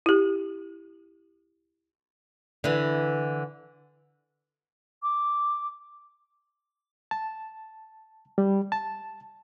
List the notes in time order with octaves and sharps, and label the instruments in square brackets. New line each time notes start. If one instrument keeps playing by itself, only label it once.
[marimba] E4 G4
[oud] D3 E3
[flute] D6
[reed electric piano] A5
G3
A5